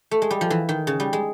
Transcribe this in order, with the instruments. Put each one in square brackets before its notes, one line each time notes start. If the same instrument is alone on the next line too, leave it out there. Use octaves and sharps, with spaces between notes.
[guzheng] A3
G#3
G3
F3
E3
D#3
C#3
G3
G#3